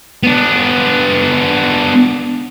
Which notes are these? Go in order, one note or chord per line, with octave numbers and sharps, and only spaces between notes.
B3 D4